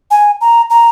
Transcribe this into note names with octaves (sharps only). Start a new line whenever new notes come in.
G#5
A#5
A#5